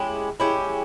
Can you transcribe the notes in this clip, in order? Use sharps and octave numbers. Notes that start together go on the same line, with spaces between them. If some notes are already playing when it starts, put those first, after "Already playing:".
Already playing: G#3 C#4 E4 G4
G#3 C#4 E4 G4